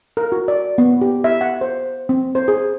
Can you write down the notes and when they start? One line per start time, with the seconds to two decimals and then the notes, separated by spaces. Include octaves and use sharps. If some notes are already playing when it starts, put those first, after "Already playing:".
0.17 A#4
0.32 F#4
0.48 D5
0.78 B3
1.01 G4
1.24 E5
1.41 F#5
1.61 C5
2.09 C4
2.35 C5
2.48 G#4